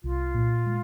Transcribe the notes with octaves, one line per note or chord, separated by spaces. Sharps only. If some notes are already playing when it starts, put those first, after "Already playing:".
C2 F4
A#2
G#3